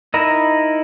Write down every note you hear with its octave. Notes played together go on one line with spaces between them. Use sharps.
D#4 E4 A#4 D#5 B5